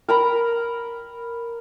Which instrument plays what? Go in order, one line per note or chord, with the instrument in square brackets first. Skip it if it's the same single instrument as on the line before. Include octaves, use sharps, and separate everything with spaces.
[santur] A#4 A#5 B5